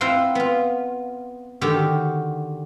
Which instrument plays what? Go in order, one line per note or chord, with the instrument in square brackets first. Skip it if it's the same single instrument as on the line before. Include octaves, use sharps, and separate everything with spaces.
[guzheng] C4 E4 F4 C5 F#5 C6
B3 F4
D3 D#3 F#4 G4